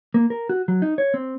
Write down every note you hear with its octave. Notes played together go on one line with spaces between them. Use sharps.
A#3
A#4
F#4
F#3
D#4
C#5
C4